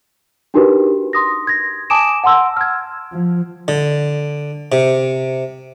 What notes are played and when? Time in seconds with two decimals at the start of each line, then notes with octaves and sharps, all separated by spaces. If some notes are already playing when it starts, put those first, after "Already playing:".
0.54 D4 D#4 F#4 G4 A#4 B4
1.13 C6 D#6 A#6
1.47 G#6 A#6
1.90 G#5 A5 D6 D#6 D7 E7
2.24 F#5 A5 C6 E6
2.57 F6 G#6
3.13 F3
3.68 D3
4.72 C3